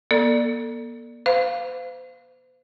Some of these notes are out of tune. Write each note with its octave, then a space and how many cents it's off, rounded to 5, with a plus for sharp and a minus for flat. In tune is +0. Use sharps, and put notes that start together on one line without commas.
A#3 +45 A4 +25 D5 +10
C5 -40 F5 +0